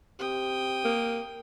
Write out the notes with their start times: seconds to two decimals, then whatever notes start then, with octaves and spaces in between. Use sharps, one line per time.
0.19 C3 G5 D#6
0.84 A#3